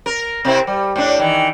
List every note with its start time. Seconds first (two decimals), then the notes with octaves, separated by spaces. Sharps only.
0.06 A#4
0.45 C3 C4 E4
0.67 G3
0.96 A2 D4
1.19 D#3 E3